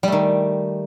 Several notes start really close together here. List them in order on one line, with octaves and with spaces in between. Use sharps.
G3 A3 D#3